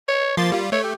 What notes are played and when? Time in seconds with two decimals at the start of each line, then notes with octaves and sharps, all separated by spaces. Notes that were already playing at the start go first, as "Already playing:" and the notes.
0.08 C#5
0.37 F3 A#3 C6 A6
0.52 G3 F4
0.72 A3 C#5
0.83 G4